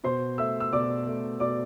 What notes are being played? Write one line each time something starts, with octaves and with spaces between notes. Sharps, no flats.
B2 C5 C6
A3 E5 E6
E6
B2 D5 D6
A3
B2 D5 D6